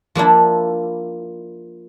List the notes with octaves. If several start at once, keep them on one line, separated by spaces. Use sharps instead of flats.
F3 A#3 D4 E4